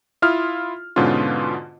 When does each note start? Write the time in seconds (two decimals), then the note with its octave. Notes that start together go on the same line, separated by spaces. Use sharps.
0.22 E4 F4 D#6 F6
0.96 G#2 B2 D3 B3 C#4 F4